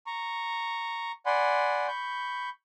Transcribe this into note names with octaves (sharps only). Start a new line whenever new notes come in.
A#5 C#6
D5 F#5 G#5 B5 C6
B5 C#6 G6